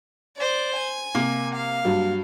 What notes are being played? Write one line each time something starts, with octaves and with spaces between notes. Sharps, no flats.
C5 D5
G#5
C3 A#3
F5
G2 F#3